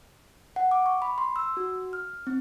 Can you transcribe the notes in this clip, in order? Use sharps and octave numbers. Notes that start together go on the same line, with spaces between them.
F#5
D6
C#6
B5
C6
E6
F#4
F6
C4